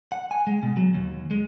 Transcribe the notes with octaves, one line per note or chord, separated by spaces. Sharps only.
F#5
G#5
G#3
B2
F#3
D#2
G#3